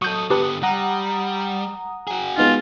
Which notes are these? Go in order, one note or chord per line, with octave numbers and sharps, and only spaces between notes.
F#3 A4 C#6 D#6 G6
D3 B3 G4 B4 A5
G3 F#5 A#5 D#6
F#4 G#4
G#3 B3 D#4 F4